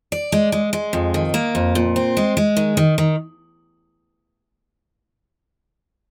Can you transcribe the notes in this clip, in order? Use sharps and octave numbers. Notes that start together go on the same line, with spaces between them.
D5
G#3
G#3
G#3
F2
D#3
A#3
F2
A#2
C4
G#3
G#3
D#3
D#3
D#3